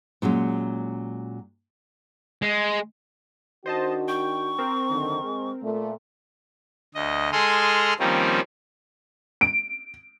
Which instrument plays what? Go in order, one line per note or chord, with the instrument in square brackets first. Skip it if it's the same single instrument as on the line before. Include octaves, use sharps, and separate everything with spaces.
[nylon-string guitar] A#2 F#3 G#3 C#4
[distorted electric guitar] G#3
[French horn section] D#3 D4 F#4 [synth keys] C5 D#5 A5
[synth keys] G5 [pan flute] C#6
[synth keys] C4 A#4
[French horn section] F#2 D3 D#3
G#3
A#2 A3
[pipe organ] D2 D#5
G#3 G#4 A4 C6 D#6 F6
D#3 F3 G3 A#3 C4 C#4
[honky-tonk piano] D7